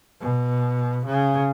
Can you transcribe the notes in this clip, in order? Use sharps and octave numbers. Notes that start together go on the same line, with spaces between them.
B2
C#3